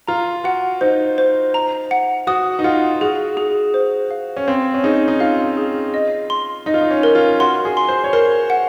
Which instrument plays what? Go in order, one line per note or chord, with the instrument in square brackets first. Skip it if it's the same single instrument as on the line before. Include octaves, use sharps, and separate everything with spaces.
[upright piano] F4 [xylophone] A#5
[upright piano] F#4 [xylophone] F#5
[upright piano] D#4 [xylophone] C5
[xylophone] C5
A#5
F#5
[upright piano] F#4 [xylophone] D#6
[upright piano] D#4
[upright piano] F4 [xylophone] F#5
[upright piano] F#4 [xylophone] G#4
[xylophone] G#4
C5
F5
[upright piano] C#4
[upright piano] C4 [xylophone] F5
[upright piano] C#4
[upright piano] D#4 [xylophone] G#4
[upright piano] D#4
[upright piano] F4 [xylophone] F5
[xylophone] G#4
D#5
C6
[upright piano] D#4 [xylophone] D#5
[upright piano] F4
D#4
C#4
[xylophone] A#4
[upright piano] F4
[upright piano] F#4 [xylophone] C6
[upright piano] G#4
[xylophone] C6
[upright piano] C5
C#5
[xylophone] A#4 [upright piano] C5
[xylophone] F#5